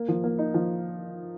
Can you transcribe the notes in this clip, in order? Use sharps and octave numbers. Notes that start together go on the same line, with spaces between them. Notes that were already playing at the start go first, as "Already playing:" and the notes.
Already playing: A#3
F3
A#3
D#4
F3